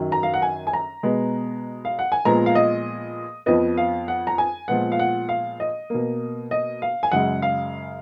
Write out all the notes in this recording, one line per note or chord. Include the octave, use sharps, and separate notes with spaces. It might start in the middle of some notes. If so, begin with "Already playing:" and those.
Already playing: F#2 D#3 F#3
A#5
F5
F#5
G#5
G#5
A#5
B2 G#3 B3
F5
F#5
G#5
A#2 F3 G#3 B3 A#5
F5
D#5
F2 F3 B3 D#5
F5
F#5
A#5
G#5
A#2 F3 G#3 B3 F#5
F5
F#5
F5
D#5
B2 A#3
D#5
F5
G#5
F#2 C#3 G#3 F#5
F5